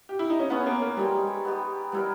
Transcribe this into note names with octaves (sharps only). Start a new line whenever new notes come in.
G4
E4
D#4
C#4
B3 C#4 G#4 B4
A#3
A#3
G3 G#3 D#4 G4
B3 D#4 G4
G3 B3 E4 A#4